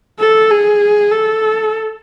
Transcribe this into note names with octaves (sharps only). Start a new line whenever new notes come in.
A4
G#4
A4